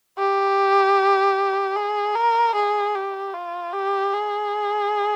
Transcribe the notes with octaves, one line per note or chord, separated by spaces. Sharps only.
G4
G#4
A#4
G#4
G4
F4
G4
G#4